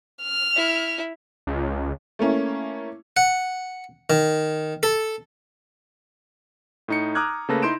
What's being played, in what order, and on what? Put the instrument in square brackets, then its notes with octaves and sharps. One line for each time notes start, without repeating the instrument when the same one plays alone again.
[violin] F6
[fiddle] E4
[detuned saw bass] C#2
[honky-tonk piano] A3 A#3 C#4 E4
[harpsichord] F#5
D#3
A4
[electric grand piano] A2 D#4 C#7
A#5 D6 D#6 F6 F#6 G#6
C#3 A3 A#3 A4 B4 A#6
D#4 E4 C6 G6 D7 E7